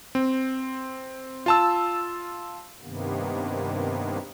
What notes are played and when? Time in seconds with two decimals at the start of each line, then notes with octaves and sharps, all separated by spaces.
0.15 C4
1.46 F4 A5 E6
2.82 G2 C3 D#3 A#3 B3